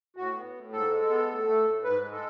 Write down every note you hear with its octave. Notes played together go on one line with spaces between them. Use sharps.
A2 F#4
B3
A2
G#2 A4
G#3
B3
A2
A3
A2
G#2 B4
G#3
A4